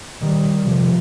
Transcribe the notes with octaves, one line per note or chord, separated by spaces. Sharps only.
D#3 G3
C3 F3